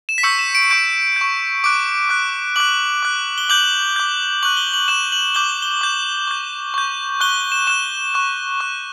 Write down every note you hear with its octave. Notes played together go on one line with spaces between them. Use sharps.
E7
B6
C#6 E6 G6 C#7
E7
D7
C#6 G6 D7
C#6 G6
D6 F#6 D7
D6 F#6
D6 F#6 F#7
D6 F#6
G7
D6 G6 F#7
D6 G6
C#6 F#6 F#7
G7
F#7
C#6 F#6 E7
F#7
D6 G6 G7
G7
D6 G6
C#6 G6
C#6 G6
C#6 F#6 G7
E7
C#6 F#6 E7
C#6 F#6
C#6 F#6